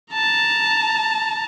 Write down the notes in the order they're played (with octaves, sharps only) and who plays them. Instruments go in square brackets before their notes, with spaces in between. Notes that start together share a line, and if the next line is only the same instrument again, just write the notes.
[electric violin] A5 A#5